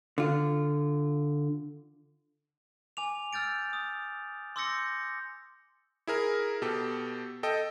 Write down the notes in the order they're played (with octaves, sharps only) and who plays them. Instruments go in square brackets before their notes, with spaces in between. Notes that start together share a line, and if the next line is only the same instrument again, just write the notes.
[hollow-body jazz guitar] D3 F4
[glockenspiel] G#5 D6 F7
E6 F6 G6 A6 D7
D#6
C6 D6 E6 G6 A#6 C#7
[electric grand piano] E4 G#4 A#4
B2 G4 A4
A4 D#5 G5